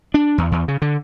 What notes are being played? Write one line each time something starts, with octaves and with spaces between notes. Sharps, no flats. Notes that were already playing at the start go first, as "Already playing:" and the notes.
D4
E2
E2
C#3
D3